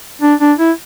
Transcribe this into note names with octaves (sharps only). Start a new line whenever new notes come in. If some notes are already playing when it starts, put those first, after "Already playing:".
D4
D4
E4